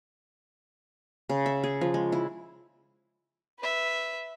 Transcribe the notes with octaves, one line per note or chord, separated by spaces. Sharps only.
C#3
E5
G#4
F3
G#3
E4
B4 E5